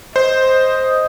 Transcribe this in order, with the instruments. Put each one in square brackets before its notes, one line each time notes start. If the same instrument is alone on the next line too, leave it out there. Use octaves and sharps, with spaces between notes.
[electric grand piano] C5 [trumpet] D#5